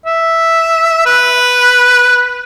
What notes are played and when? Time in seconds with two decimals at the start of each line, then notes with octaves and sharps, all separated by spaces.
0.06 E5
1.06 B4